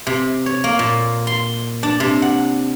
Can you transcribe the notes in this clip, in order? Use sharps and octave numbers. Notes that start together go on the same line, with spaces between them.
C3
C#5
A#3
A#2
C6
D4
C3
F#5